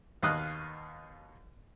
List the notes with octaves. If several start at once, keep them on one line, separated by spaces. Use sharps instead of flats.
D#2 B2 D#4 D#5 F5 F#6